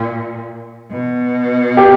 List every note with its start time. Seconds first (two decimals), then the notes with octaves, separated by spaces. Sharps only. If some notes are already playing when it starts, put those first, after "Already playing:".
Already playing: A#2
0.91 B2
1.77 G4